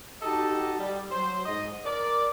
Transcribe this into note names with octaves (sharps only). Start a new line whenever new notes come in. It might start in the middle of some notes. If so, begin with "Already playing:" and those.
D#4 F#4 G4 A4 D#5 A5
G3
F#3 C5
G#2 D#5
A#4 D5